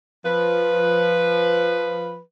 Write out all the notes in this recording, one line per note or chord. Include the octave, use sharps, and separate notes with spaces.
F3 B4